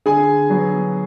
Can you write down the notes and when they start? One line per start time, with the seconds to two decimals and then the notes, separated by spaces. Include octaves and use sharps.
0.06 D3 G#4 G#5
0.50 F#3 B3